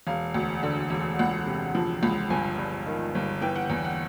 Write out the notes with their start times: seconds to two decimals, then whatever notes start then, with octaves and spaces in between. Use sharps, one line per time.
0.07 E1 F5
0.34 D2
0.63 D3
0.90 E1
1.19 C#2 F#5
1.47 C3
1.75 F3
2.03 C#2
2.30 G1 G#5
2.58 G2
2.86 D#3
3.15 G1
3.42 E3 G5
3.56 F#5
3.70 E2
3.85 F#5